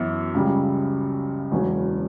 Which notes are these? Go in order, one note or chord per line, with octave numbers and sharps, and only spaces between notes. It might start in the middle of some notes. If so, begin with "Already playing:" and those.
Already playing: F#2 E3 B3
C#2 C#3 G3
E1 E2 C#3 F#3 C#4